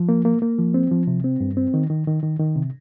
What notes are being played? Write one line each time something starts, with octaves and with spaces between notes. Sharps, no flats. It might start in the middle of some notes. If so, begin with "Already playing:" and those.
Already playing: F3
A#3
A#3
A#3
F3
C4
F3
C3
C4
G2
C4
D#3
D#3
D#3
D#3
D#3
C3